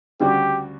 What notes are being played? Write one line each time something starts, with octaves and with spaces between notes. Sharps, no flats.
D2 C#3 G3 D4 F#4 G4